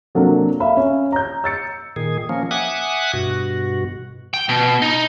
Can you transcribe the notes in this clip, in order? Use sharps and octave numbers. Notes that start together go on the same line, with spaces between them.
C3 F#3 A#3 D4 A4 A#4
E5 F5 B5
C#4
A#5 G6
E6 A6 C#7
A#2 D#3 G#4
F3 A#3 C#4
E5 F#5 G#5 D6 D#6 F#6
G2 B2 F#4
G5
B2
D#4